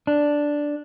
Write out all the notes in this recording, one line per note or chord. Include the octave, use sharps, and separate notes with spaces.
D4